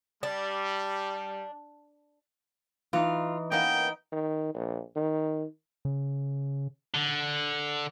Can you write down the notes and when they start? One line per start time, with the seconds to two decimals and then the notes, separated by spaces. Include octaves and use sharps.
0.23 G3 D4
2.93 E3 D#4 F4
3.52 A#3 B3 C#4 D#4 G5
4.12 D#3
4.54 A#1
4.96 D#3
5.85 C#3
6.95 D3